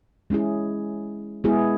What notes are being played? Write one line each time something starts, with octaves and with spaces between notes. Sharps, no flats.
G#3 C#4 E4 G#4
G#3 B3 E4 G#4